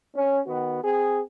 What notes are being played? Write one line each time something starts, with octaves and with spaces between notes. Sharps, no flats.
C#4
D#3 B3 F#4
C4 G#4